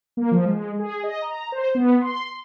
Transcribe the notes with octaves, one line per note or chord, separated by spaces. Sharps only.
A#3
F3
G#3
G#4
D#5
A#5
C5
B3
C6